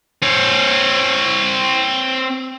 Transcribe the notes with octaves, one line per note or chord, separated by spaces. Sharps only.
C4 C#5